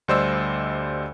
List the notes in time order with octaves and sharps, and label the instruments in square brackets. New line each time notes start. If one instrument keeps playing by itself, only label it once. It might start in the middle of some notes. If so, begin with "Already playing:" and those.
[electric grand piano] D2 G3 C5 D5 D#5 E6